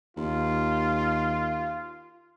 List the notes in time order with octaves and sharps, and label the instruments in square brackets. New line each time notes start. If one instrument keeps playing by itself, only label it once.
[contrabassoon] D#2 [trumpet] F4